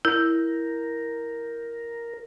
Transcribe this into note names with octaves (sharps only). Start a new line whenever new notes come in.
E4 A#4 G6